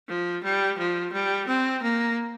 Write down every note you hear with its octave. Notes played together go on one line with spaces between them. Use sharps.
F3
G3
F3
G3
C4
A#3